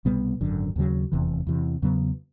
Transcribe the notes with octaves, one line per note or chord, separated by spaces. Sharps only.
C2 B2 G3 B3
G#1 F#2 D3
D#2 C#3 F#3
F1 E2 C3 E3
E2 C3 E3
E2 C#3 F#3 B3